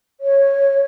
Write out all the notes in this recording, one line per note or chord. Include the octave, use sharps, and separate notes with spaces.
C#5